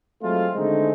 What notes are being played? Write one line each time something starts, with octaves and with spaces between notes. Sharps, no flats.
F#3 G#3 A3 C4 F4
D3 D#3 G#3 A3 C4 D#4